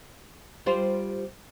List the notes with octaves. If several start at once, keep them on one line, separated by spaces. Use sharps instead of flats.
G3 F4 C5